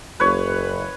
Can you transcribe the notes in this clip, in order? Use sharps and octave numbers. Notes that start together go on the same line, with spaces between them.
F#1 B4 C#5